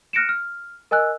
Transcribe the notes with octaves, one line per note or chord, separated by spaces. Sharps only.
F6 F#6 A#6 C#7 D7 E7
F6
A#4 D#5 G#5 E6 F#6